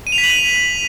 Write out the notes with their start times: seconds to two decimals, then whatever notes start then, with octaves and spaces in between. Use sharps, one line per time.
0.07 D#7
0.12 F7
0.18 B6
0.24 F#7
0.29 D#7